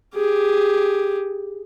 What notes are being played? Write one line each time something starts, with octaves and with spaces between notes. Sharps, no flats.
G4 G#4